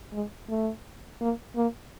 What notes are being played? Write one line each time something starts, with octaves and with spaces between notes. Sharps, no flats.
G#3
A3
A#3
A#3